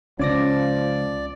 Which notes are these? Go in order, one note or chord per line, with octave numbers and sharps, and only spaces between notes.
C#2 F3 C#4 D5 D6 A#6